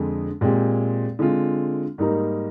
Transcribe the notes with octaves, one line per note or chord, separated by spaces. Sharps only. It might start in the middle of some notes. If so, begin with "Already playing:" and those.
Already playing: F2 D3 G#3 C4
A#2 G#3 C4 G4
D3 G#3 C4 F4
G#2 G3 A#3 D#4 A#4